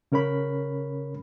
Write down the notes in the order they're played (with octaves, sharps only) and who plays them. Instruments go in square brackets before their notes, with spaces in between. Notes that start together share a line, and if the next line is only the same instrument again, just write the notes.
[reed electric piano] C#3 C#4 A#4 C#5 B5